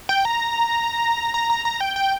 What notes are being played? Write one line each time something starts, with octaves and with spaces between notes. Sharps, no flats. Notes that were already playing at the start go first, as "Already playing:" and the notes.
G5
A#5
A#5
A#5
A#5
G5
G5